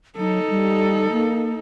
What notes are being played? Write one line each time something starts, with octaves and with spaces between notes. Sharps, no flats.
F#3 D#4 A4
G3
A#3